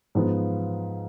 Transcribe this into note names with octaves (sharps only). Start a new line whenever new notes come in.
G#2 F3 B3